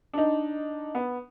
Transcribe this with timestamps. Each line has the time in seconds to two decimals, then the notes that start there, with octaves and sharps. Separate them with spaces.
0.13 D4 D#4
0.95 B3